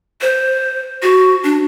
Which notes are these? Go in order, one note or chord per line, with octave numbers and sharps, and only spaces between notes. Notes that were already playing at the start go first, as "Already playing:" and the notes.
C5
F#4
D4